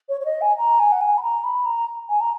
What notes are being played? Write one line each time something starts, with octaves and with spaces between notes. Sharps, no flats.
C#5
C#5
D#5
G#5
A#5
G#5
F#5
G#5
B5
A#5
B5
A#5
G#5
A#5